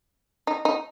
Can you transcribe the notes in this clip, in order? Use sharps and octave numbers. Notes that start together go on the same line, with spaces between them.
D#4
D#4